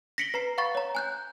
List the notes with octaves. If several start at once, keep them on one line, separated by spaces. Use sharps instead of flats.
A#6 B6 C#7 D7 F#7 G7
B4 A#5 C7
F5 F#5 B5 C#6 A6
C#5 A#5
G#5 F#6 G6